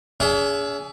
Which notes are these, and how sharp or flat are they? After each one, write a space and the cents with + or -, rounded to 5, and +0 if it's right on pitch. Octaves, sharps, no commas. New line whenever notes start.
C#4 +45 G#4 +0 E5 +15